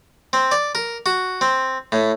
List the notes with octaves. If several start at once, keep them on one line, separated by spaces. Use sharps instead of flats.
C4
D5
A#4
F#4
C4
A2